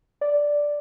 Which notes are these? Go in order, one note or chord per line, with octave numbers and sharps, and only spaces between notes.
D5